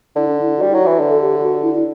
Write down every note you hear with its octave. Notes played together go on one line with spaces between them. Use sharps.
D3 E4
D4
E4
G3 F#4
F#3 E4
E3 F#4
D3
A4
G4
F#4
E4
E4